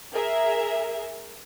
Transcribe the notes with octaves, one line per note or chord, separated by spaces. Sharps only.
G#4 A#4 E5